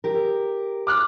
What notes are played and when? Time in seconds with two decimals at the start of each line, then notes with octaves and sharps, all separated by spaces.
0.04 G4 A#4
0.87 D6 F6 F#6